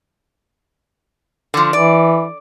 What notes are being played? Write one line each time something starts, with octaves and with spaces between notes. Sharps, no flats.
D3 F3
E3 D5